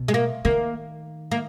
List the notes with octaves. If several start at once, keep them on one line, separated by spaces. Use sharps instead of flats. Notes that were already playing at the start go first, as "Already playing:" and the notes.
Already playing: B2
G#3
A#3
D#3 A#3
A#3